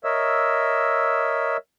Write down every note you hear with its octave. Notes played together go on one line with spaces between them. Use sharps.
A#4 C#5 D#5 E5 E6